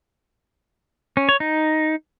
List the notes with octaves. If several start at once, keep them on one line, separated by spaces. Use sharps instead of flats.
C#4
C#5
D#4